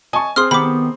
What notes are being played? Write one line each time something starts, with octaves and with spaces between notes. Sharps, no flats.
D#5 G#5 A5 C#6
C4 G#4 C6 D#6 F6
D#3 B3 G4 B5 D6